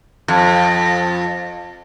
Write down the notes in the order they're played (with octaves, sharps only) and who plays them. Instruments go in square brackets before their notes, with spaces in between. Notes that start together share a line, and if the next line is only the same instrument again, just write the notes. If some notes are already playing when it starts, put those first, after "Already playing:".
[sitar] F2